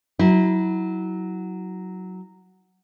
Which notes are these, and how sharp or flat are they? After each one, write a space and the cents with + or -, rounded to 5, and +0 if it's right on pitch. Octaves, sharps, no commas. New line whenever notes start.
F#3 +5 E4 -25